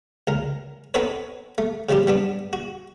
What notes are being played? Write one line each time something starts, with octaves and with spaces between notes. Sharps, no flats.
C#2 A#4
B3 C4 D#4 A4 B4 C#5
A3
C#3 F3 G3 C4 G4
G3 B3 D4
F#4